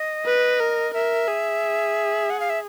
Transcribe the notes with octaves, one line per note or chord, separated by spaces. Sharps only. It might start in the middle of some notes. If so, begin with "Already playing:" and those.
Already playing: D#5
B4
A#4
A#4 E5
G#4
F#5
F5
E5